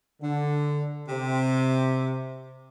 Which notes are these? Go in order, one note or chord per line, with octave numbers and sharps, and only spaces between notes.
D3
C3